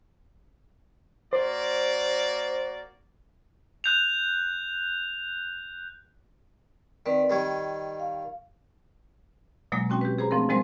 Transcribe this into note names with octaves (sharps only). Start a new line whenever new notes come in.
A#3 F#4 C5 D5
F#6 G6 F7
D#3 C4 B4 D5
D#3 G3 C#5 D#5
F5
B2 F#3 G#3 A#3
C4 C#4 F#4 G5
G4 B4
G#4 C5 A#5 B5
F3 A3 C4 D4 A#4
F3 G3 G#3 C4 A#4 C5